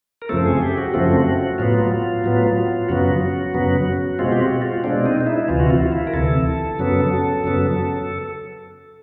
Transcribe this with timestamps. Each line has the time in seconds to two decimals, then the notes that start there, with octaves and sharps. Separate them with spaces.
0.22 A#4
0.29 F#2 C#3 F3 A3 C4 A4
0.46 G#4
0.62 G4
0.78 F#4
0.94 F#2 C#3 F3 A3 C4
1.58 A2 F#3 B3 F4
2.24 A2 F#3 B3
2.89 F#2 C#3 F#3 B3 F#4
3.54 F#2 C#3 F#3 B3
4.19 B2 G#3 C4 F4
4.32 G4
4.40 F#4
4.62 F4
4.84 B2 G#3 C4 D4
5.06 D#4
5.21 D#4
5.26 E4
5.48 D2 C3 E3 F4
5.60 F#4
5.70 F4
5.92 E4
6.07 A#4
6.14 D2 C3 E3 A4
6.79 F#2 C#3 F#3 B3
7.44 F#2 C#3 F#3 B3